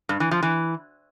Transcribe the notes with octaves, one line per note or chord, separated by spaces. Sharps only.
G2
E3
F3
E3